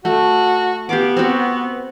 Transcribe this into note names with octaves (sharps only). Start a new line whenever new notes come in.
A3 F#4
B3 G4 F5 D6
C4 F#4